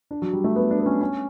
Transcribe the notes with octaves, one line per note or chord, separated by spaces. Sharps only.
D4
F#3
G3
A3
B3
D4
B3
C#4
C#4